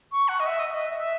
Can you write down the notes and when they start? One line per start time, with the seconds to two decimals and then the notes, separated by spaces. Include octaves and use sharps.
0.12 C#6
0.28 F#5
0.40 D#5
0.46 E5
0.59 D#5
0.73 D#5
0.86 E5
0.99 E5